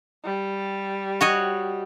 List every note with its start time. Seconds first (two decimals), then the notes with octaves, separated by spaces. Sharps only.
0.24 G3
1.21 F#4 C#5 D#5